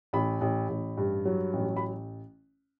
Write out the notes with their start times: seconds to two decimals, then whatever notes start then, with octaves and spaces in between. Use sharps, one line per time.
0.13 A1 B5
0.41 A1
0.69 A1
0.97 G2
1.25 F#3
1.53 A1
1.77 B5